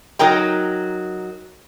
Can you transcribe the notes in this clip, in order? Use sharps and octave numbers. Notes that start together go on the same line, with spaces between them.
F#3 D#4 A#4 G5 A#5